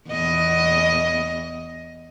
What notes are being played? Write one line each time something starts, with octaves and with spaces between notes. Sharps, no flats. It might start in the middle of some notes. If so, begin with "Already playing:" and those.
E2 D#5